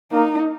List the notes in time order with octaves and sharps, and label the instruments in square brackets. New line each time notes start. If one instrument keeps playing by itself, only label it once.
[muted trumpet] A#3 [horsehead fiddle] D#4